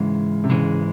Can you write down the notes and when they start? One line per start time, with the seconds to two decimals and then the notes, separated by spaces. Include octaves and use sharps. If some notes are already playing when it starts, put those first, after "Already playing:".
Already playing: G#2 C#3 E3 G#3
0.44 C3
0.49 G#2 C#3 E3 G#3